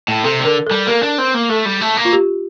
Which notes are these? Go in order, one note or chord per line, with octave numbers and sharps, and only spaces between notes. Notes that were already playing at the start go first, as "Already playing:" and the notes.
A2
C3 A4
D3 A#4
G3 A4
A#3 A#4
D4
C4
A#3
A3 A4
G3
A3
A#3
F4
G4